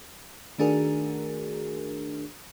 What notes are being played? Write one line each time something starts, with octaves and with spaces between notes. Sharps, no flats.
D#3 A3 D4 F#4 G#4 A#4